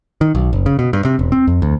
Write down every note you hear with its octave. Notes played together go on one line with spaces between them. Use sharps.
D#3
B1
F#1
C#3
B2
G2
C3
E1
C4
F2
D2